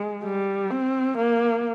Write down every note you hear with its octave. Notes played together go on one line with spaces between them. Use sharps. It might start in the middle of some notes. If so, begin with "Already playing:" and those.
Already playing: G#3
G3
C4
A#3